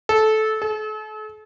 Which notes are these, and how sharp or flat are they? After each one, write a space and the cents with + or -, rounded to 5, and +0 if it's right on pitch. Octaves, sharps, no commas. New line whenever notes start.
A4 -15
A4 -40